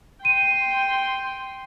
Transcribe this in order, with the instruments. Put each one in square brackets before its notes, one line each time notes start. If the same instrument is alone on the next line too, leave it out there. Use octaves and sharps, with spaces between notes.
[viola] G5 C6 [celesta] D#7